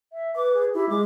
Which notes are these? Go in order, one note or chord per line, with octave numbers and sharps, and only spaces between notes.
E5
B4 D6
G#4
E4 G4
G#3 D6